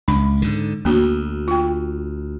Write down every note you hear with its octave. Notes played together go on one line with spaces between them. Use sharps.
C#2 D4 B5
G#2 D3
D2 A#3 D4 F#4
F4 G5